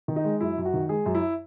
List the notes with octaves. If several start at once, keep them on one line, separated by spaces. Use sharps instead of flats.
D#3
D#4
G#3
F#2 E4
F#2
F#4
D#3
G#3 G#4
F#2
E4